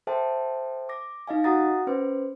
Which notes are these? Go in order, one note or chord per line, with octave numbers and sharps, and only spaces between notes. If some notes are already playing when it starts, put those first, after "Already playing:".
A4 C5 E5 G5 A5
D6 A#6
D#4 D#5 F5 G#5
F#4 F#5 A#5 D#6 A6 A#6
C#4 B4 C5